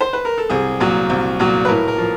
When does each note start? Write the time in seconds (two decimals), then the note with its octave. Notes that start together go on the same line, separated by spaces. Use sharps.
0.01 C5
0.13 B4
0.25 A#4
0.38 A4
0.50 C2 G#4
0.80 A#2 F#3
1.10 C2
1.39 A#2 F#3
1.65 B4
1.68 A2 A#4
1.88 A#4
1.98 F3